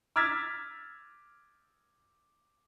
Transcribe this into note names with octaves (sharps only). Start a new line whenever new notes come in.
D6 E6 F6 G#6 A6 B6